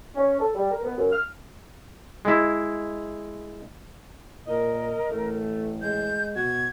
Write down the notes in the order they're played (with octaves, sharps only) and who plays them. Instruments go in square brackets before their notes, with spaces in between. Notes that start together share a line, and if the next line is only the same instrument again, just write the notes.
[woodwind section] C#4
A4
G3
A#4
B3
F#2
F6
[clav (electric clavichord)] G#3 E4
[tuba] A#2 [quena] A#4 [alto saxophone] D#5
[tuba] A1 [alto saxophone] A3
[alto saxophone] G#3 [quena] G6
[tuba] B2 [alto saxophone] F#4 [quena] G#6